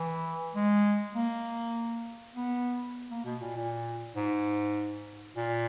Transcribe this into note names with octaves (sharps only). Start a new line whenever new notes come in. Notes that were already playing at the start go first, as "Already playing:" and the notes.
Already playing: E3
G#3
A#3
B3
A#3
B2
A#2
A#2
G#2
A#2